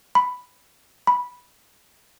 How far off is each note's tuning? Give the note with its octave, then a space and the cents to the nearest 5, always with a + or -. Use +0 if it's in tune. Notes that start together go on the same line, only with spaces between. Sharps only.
B5 +5
B5 -10